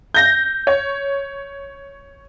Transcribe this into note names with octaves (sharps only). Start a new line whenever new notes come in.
G6 A#6
C#5